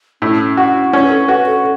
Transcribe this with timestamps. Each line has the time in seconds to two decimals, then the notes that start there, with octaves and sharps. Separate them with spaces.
0.22 A2 C#4
0.57 F#4
0.92 C#4 E4
1.04 B4
1.10 A4
1.28 F#4 B4
1.46 A4